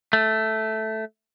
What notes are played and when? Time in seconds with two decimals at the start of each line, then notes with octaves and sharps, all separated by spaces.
0.13 A3